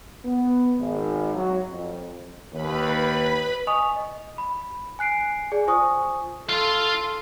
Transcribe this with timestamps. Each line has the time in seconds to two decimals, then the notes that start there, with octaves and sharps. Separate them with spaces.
0.25 B3
0.79 G#1
1.34 F#3
1.69 F2
2.52 D#2 B4 B5
3.67 D#5 G#5 C#6 D#6 F7
3.96 D#5
4.38 B5
4.99 G#5 F#6 C7 D7
5.52 G#4 D5 G#5
5.67 F4 C5 G#5 C#6 D#6
6.49 F4 A4 F5 C6